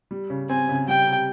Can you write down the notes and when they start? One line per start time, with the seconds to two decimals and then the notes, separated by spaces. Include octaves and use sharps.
0.11 G3
0.30 C#3
0.49 C4 G#5
0.69 C#3
0.88 G3 G5
1.07 C3